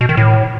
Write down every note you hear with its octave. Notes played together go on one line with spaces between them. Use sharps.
B2
D#3
A2